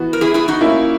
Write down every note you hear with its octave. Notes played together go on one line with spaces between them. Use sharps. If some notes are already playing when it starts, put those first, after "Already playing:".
Already playing: E3 B3 F#4
A#4
E4 G#4
E4 G#4
D#4 F#4
A#3 C#4 E4